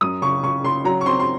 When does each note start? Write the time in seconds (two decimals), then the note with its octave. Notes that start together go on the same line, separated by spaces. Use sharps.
0.01 F#2 D#6
0.22 C#3 C#6
0.43 C#3 C#6
0.64 C#3 C6
0.84 F#3 A#5
1.01 C#6
1.06 C4 C6
1.20 C6